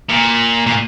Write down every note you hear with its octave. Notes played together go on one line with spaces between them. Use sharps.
A#2
A#2